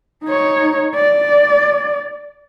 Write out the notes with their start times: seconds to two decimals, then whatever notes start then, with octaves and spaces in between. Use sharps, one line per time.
0.24 D#4 C#5
0.95 D5